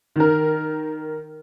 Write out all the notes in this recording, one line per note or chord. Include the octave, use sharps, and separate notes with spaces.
D#3 A#4